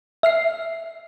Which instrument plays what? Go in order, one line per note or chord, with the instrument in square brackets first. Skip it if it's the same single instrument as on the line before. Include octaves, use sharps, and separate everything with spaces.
[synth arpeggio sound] E5 F6 C7